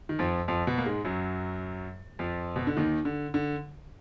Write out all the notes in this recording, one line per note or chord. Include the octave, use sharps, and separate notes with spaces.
D#3
F2 F3
F2 F3
B2 B3
A#3
G#2 G#3
F#2 F#3
F2 F3
B2
D3
D#2 D#3
D3
D3